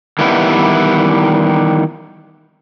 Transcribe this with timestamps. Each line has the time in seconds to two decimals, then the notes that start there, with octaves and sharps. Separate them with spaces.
0.19 D#3 E3 G3 B3 E4